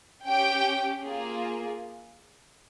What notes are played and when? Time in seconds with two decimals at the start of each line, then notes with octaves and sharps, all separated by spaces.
0.26 C#4 G4 G5
1.02 A#3 F4 G#4